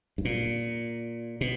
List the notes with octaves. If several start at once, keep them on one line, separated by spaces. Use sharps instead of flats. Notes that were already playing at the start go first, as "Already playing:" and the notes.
G2
A#2
B2